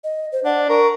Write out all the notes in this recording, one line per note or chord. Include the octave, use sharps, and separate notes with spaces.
D#5
C5
D4 F#5
A#4 C#6